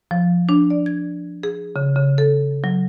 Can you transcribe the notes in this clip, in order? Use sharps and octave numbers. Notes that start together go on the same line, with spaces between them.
F3
D4
D5
G#6
G#4
C#3
C#3
A4
F#3